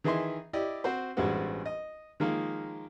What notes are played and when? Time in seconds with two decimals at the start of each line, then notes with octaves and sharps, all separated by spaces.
0.04 D#3 E3 G#4 D#5 E5 C6
0.53 E4 G4 D5 D#5
0.84 C4 F#4 C5
1.17 A1 G2 G3 G#3 C4 F#4
1.66 D#5
2.20 D#3 F3 G#3 A#3 D#4